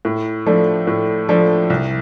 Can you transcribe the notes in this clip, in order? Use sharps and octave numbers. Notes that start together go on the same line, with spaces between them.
A2
F3 A3 D4
A2
F3 A3 D4
C2